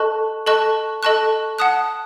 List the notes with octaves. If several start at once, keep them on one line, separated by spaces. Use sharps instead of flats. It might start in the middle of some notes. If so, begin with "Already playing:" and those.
Already playing: A4 D#5 A5 C#6 F#6
A4 D#5 A5 C#6 F#6
A4 D#5 A5 C#6 F#6
F#5 A5 D#6 F#6